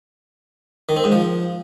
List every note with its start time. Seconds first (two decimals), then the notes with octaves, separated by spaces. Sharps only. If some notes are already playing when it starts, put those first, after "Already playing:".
0.89 D#3
0.97 C4
1.04 G#2
1.12 F3